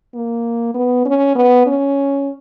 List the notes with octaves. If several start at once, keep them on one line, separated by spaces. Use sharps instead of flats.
A#3
B3
C#4
B3
C#4